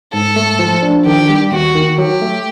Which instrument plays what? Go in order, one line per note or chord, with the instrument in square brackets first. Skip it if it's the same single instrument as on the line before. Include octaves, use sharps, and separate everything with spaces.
[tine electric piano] G#2 [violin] A4
[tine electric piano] A3
F3
D4
[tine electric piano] D#3 [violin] G4
[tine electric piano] G3
[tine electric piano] D#2 [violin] F#4
[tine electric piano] D#3
[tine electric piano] F#3 [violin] G4
[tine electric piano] A3